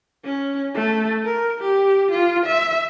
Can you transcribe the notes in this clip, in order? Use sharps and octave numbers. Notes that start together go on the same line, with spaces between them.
C#4
A3
A#4
G4
F4
E5